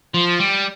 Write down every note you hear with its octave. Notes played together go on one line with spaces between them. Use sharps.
F3
G3